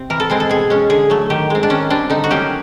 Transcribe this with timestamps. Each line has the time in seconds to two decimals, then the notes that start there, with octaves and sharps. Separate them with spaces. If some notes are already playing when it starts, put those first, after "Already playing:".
Already playing: C3 C4
0.10 E3 A#4
0.20 A4
0.30 G#3 C4 G#4
0.40 A4
0.50 B2 G#4
0.70 G#3 C#4
0.90 D3 G#4
1.10 F#3 A3
1.30 D#3 G4
1.50 G#3 C4
1.63 D4
1.70 D#3 C#4
1.90 G3 C4 D4
2.10 D3 D#4
2.24 F#4
2.30 F#3 A#3 C#4 G4